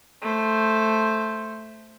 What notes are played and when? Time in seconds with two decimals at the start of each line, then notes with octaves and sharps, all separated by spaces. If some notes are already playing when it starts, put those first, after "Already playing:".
0.22 A3 C5